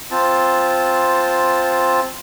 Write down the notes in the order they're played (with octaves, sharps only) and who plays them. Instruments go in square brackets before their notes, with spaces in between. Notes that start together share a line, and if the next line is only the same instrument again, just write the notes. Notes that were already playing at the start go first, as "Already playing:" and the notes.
[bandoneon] C4 F4 A5